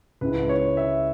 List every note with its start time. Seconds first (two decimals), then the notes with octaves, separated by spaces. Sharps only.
0.21 C#2 C#3 G#3 E4 B4
0.49 C#5
0.77 E5